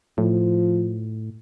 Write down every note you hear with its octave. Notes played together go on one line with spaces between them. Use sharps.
A2 F3